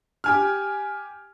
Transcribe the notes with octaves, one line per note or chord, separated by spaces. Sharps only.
G4 G#5 F6